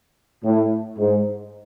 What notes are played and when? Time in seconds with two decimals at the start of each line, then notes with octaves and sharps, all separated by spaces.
0.44 A2
0.98 G#2